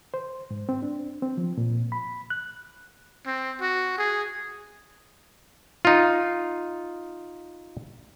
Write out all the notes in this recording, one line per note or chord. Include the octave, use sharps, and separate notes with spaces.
C5
G#2
C4
D4
C4
F3
A#2
B5
F#6
C4
F#4
G#4
D#4 F4